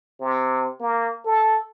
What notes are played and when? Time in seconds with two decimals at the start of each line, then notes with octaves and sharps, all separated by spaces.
0.20 C3
0.80 A#3
1.25 A4